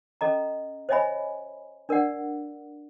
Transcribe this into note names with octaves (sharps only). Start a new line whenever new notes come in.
C#4 A4 D#5 A#5
C5 C#5 D#5 E5 G#5 B5
D4 A#4 D5 F#5